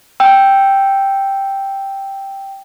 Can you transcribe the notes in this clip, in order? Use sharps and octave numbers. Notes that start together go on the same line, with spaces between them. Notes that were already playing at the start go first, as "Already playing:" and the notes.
G5 E6